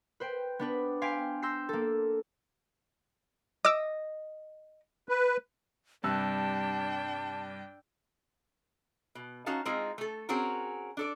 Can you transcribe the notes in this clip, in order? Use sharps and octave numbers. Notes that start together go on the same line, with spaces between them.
B4 C5 G5
B3 D4 B4
F5 G5 G#5 C6 B6 D7
C6 E6 G6 A#6 C7
A#3 A4
D#5 D6 E6
B4
G2 C3 G3 D4 G5 A5 E6 F#6
B2
C#4 D#4 F#4 F5 A5
G#3 C4 D#4 F4 G#4
A3 A4
C4 C#4 F#4 G#4 A#4
D4 A4 D5